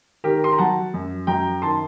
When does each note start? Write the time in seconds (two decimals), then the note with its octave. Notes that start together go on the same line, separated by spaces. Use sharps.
0.24 D#3 G4 A#4
0.44 C6
0.52 A#5
0.59 F#3 F#5 A5
0.94 F#2
1.27 F#2 G5 A#5
1.62 D#3 A5 C6